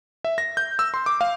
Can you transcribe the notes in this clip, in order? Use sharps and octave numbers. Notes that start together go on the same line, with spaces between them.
E5
A#6
G6
E6
C6
D6
F5